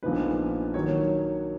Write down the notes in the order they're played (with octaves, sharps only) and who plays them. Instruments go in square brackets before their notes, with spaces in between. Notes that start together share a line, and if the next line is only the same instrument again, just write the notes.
[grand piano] A#1 A#2 F3 B3 D#4 B4
D#3 F#3 C#5